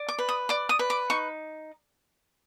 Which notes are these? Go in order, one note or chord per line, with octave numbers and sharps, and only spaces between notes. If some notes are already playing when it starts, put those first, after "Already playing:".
Already playing: D5
D6
B4
D#6
D5 D6
D#6
B4
D6
D#4 C#6